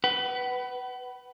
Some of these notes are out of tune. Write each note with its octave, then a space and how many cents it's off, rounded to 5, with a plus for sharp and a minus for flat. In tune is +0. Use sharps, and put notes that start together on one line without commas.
B4 +0 F#5 +35